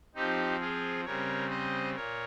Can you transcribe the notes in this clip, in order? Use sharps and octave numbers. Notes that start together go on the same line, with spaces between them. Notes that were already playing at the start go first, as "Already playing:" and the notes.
F3 C4 D#4 G4
F4 G#4
C#3 G3 C4 A#4 C#5
C5 D#5
A#2 A#4 C#5